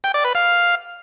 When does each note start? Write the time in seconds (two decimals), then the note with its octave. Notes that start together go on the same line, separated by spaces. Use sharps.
0.04 G5
0.14 D5
0.25 B4
0.35 F5